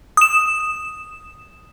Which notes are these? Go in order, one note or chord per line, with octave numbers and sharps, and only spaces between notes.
D#6 E7